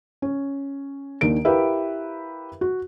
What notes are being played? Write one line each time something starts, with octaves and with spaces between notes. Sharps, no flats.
C#4
D#2 D#3 D4 A#4 D7
E4 G4 A#4 B4 E5 F5
F#4